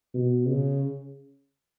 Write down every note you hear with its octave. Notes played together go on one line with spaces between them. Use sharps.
B2
C#3